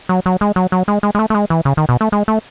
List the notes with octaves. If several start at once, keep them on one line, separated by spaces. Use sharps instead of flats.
F#3
F#3
G#3
F#3
F#3
G#3
G#3
G#3
A3
A3
G#3
E3
C#3
D#3
B2
A3
G#3
A3